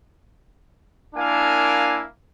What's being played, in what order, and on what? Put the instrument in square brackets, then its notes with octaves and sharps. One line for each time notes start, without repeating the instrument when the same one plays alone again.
[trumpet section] A#3 D4 E4 A#4 F5 G#5